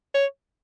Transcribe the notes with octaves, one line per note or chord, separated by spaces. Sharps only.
C#5